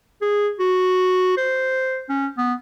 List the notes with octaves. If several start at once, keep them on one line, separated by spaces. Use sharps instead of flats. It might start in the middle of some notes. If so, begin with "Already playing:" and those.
G#4
F#4
C5
C#4
B3